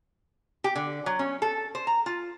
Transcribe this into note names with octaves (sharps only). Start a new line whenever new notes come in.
G4
D3
F#3
C#4
A4
C5
A#5
F4